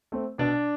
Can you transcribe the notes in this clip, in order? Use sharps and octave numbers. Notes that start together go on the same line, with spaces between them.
A3 C4
B2 D4 D5